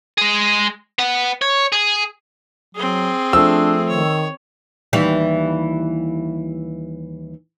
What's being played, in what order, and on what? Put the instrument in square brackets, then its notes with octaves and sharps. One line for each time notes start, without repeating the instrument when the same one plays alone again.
[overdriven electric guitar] G#3 G#4
B3 F#5
C#5
G#4
[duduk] F#3 [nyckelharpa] C4 G#4
[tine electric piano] F3 A3 [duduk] D4 [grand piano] E6
[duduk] D#3 [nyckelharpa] C#5
[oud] D#2 E3 G3